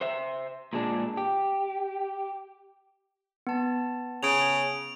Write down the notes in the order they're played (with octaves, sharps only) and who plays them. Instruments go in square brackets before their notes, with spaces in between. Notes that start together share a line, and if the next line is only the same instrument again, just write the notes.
[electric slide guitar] C5 E5
A#2 G#3 D4
G4
[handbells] B3 A5
[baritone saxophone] C#3 [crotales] D7 F7